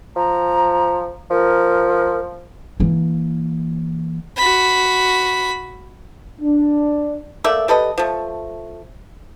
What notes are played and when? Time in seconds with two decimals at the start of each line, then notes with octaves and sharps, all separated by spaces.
0.16 F3 A#5
1.31 F3 A#4
2.80 E3 A#3
4.37 F#4 B5
6.41 D4
7.44 A3 A#3 D5 E5
7.68 G3 A4 B4 D#5
7.98 F3 A3